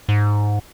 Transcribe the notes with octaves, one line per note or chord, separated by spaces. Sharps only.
G#2